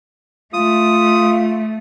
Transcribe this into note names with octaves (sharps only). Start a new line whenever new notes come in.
A3 F4 D#6